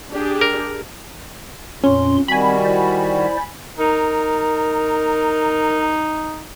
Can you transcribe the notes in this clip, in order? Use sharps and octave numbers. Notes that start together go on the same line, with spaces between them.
D4 G4 G#4
A#4
F2 A#2 C#4 C6
D#3 G3 C4 F#4 G#5 B5
E4 C5 D5
D#4 A#4